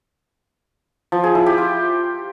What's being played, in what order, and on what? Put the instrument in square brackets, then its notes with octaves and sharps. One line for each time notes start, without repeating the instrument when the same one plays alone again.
[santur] F3
G#4
E4
G4
F4